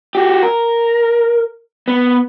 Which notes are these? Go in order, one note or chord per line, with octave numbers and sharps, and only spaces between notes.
F#4 G4
A#4
B3